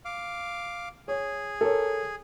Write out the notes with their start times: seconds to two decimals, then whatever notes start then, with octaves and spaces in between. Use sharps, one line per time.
0.05 F5 D6
1.08 G#4 C#5
1.61 A4 A#4 C#5